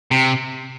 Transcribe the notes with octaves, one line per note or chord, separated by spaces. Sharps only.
C3